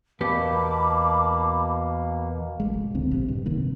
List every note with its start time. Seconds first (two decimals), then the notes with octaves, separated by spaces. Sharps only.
0.21 E2 B2 A#3 B3 G4 A5 B5 D6
2.60 A1 G#3
2.74 F1
2.94 C#2 D3 C4
3.11 A#1 C3
3.28 G2
3.46 F1 C3 D#3 A#3